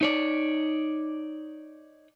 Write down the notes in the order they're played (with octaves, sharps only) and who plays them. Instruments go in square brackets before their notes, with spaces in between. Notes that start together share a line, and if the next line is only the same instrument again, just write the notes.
[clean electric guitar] D#4 C#5 D5